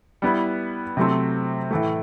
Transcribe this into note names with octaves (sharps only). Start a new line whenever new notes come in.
G3 B3 E4 B4
C3 F#3 A3 C4
A2 E3 A3